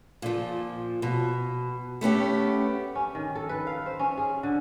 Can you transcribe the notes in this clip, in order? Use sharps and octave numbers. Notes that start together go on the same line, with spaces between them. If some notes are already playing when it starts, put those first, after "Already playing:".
A#2 F3
B2
A3 B3 C#4 G4
C#4
D#3
A4
B4
F5
C5
C#4
G#4
D3